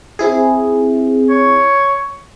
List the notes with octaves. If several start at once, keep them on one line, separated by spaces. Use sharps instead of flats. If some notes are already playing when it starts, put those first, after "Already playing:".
C4 E4 G#4
C#5